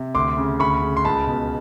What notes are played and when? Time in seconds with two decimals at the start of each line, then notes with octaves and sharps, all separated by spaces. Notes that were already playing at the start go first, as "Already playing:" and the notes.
Already playing: C3
0.15 D2 C6 D6
0.38 C#3
0.59 D2 B5 C#6
0.82 C#3
0.97 C6
1.05 C#2 A5 B5
1.27 B2